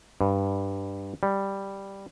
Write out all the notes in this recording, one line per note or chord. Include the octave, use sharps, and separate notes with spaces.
G2
G3